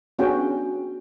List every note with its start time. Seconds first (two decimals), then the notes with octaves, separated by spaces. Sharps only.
0.19 B3 C#4 D4 F#4 G#4 G5